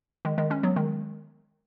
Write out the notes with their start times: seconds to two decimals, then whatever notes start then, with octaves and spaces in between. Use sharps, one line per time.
0.25 D#3 G#3
0.38 D#3 G#3
0.50 G#3 C#4
0.63 F#3 B3
0.76 D#3 G#3